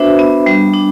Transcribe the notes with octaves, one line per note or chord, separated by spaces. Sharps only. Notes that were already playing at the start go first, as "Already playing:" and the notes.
Already playing: B3 D4 F#4 B4 C5 E5
B3
G3
D4